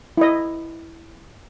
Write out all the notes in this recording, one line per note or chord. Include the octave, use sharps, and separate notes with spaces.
E4 D#5